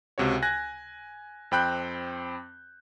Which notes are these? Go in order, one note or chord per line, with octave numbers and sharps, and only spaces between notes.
C#2 C3 F#4 C#5
G#5 F#6 G#6 A#6
F2 C4 G5 B5 F#6 G6